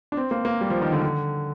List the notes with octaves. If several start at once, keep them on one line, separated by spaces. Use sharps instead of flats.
D4
C4
A#3
A#3
G3
F3
D#3
D3
D3